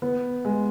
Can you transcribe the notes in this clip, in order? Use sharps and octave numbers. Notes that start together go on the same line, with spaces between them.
B3
G#3